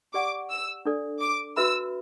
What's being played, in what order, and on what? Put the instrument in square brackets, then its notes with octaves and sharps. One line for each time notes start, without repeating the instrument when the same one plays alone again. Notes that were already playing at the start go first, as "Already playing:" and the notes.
[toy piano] G4 D5 F#5 C#6 [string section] D6
[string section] E6
[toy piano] D4 A4 D5
[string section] D6
[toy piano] F#4 B4 E5 B5 [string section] E6